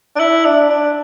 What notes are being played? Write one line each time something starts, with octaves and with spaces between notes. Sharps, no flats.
D4
E4
D4
D4